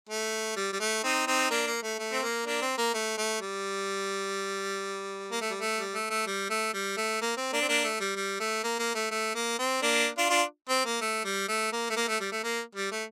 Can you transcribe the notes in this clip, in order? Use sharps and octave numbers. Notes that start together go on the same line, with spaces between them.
A3
G3
G3
A3
C4 D#4
C4 D#4
A#3 D4
A#3
A3
A3
C4
A#3
A#3 D4
C4
A#3
A3
A3
G3
A#3
A3
G3
A3
G3
A3
A3
G3
A3
G3
A3
A#3
C4
A#3 D4
C4
A#3 D4
A3
G3
G3
A3
A#3
A#3
A3
A3
A#3
C4
A#3 D4
D4 F4
D4 F4
C4
A#3
A3
G3
A3
A#3
A3
A#3
A3
G3
A3
A#3
G3
A3